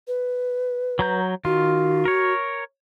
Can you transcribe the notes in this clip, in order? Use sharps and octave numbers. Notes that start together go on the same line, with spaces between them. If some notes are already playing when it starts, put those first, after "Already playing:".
B4
F#3 A#5 G6
D#3 F4 F#4
A#4 C#5